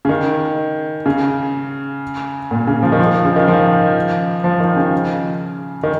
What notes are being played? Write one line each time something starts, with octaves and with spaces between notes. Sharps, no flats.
C#3
D#3
C#3
A#2
C#3
F3
D#3
F3
C#3
D#3
F3
F3
D#3
C#3
D#3